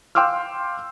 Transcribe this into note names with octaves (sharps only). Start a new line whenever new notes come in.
F5 G5 C6 D6 E6 F6